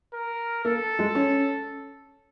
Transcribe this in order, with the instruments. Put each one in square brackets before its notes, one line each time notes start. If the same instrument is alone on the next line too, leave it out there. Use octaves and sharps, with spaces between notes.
[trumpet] A#4
[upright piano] A#3 [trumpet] A4
[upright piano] G#3
C#4